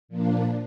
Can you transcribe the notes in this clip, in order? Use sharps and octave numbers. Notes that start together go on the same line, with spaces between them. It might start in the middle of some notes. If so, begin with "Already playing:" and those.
A#2 F3 A#3 D4